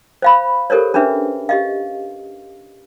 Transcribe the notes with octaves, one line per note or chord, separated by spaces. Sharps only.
C5 F5 B5
G4 A4 A#4 C5 C#5
C#4 D4 G#4 B4 E5
G4 D#5 F5